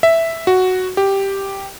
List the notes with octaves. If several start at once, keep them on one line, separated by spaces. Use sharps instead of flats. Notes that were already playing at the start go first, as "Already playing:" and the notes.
E5
F#4
G4